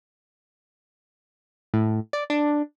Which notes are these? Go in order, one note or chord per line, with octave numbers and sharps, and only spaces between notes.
A2
D5
D4